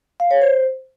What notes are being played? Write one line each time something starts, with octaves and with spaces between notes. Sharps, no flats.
F5
C#5
C5